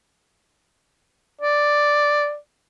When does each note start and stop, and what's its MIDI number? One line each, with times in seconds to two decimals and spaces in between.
1.41 2.36 74